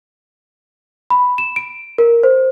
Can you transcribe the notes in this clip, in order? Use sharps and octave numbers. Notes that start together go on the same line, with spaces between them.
B5
E7
D7
A#4
C5